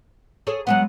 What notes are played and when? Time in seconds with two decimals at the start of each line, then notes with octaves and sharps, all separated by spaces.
0.47 G#4 A4 C#5
0.67 F#3 G#3 B3 F#5